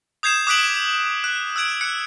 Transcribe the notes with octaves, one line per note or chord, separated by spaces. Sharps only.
D#6 G6 G#6 C7 E7
D6 D#6 F#6 B6 D7 F#7
F#6
E6 F#6 G#6 D7
F#6 C#7